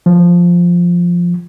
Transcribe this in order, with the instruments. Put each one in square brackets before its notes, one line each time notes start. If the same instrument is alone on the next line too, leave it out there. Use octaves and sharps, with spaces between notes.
[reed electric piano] F3